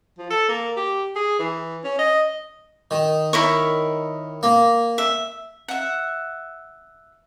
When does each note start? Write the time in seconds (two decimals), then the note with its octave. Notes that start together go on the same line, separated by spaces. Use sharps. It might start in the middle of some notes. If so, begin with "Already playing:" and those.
0.19 F3
0.30 A4
0.49 A#3
0.77 G4
1.16 G#4
1.40 E3
1.84 C#4
1.99 D#5
2.91 D#3
3.33 E4 A#4 C#5
4.43 A#3
4.98 E5
5.68 E5 F#5